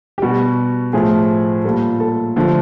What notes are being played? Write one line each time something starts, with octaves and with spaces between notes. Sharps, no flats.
G4
B2 G3 F#4
A2 F3 A3 G#4
A#2 G3 A4
A4
D3 F3 A3